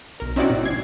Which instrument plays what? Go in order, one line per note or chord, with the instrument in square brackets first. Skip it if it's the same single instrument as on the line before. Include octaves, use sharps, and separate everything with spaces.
[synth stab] B1 A#4
C4 C#4 D#4 E4 F#4 D5
G#1 A#2
A#1 G#6 C7